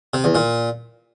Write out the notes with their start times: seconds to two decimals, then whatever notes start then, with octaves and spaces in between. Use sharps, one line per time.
0.14 C3
0.24 E2
0.35 A#2